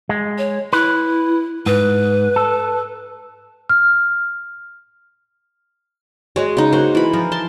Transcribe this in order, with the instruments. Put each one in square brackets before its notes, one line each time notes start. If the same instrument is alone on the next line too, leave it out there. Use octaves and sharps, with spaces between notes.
[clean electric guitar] G#3
[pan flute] C#5
[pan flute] E4 [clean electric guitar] B4
[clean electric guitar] G#2 [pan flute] B4
[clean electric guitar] A4
[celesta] F6
[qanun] G#3 [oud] F#4 C#5 D#5
[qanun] C#3 D#4
[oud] A#3 F#4 [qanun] C5
[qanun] E3 B5
[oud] F3 [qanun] A#4
[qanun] A5 C6